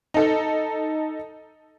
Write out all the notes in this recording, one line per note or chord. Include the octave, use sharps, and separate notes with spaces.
D#4 A4